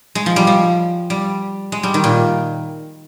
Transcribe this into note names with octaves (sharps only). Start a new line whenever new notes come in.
G#3
F3
G3
F3
G3
G#3
G3
D#3
A#2